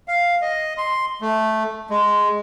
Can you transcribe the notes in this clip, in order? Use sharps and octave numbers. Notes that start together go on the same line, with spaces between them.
F5
D#5
C6
A3
G#3